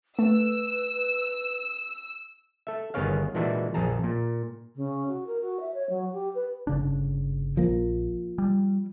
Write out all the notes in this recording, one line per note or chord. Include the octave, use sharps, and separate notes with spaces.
A3 B4 E6
A4 E5
G1 D#3 B3 G#4 C#5 F5
A#2 E3 G#3 D4 E4 F#4
A#1 F2 G#4 A5 A#5
A#2
C#3
F#4
A#4
F#4
E5
C#5
F#3
G4
B4
G1 C#3 D4
A#1 F3 A#3
G3